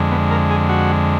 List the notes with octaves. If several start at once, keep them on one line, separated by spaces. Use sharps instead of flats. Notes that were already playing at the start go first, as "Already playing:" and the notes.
Already playing: F2 D3 G#3
B3
A#4
G#4
F#4